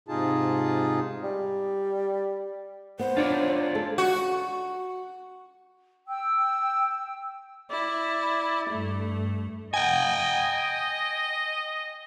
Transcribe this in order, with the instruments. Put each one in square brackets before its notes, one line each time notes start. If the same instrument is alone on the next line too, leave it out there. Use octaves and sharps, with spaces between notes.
[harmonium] G#2 C3 D#4 F4 G#4 A5
[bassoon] G3
[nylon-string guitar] B3 [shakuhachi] C5
[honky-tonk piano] D4 [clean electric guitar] F4 C#5 D5
[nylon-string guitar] G#3 A4
[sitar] F#4
[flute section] G5 E6
[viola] E4 [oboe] D5
[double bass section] G2 [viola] A3
[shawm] D#5 [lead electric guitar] G5 G#5